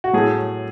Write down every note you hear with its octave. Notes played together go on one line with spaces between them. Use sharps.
F#4
A2 F#3 A3 G#4